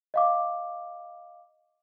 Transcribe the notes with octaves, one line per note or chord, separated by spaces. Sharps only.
D#5 F5 D6